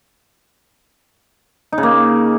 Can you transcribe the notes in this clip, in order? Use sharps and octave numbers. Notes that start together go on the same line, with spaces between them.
D#4
C#3
A#3